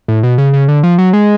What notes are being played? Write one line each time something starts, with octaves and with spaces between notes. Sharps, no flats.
A2
B2
C#3
C#3
D3
F3
F#3
G#3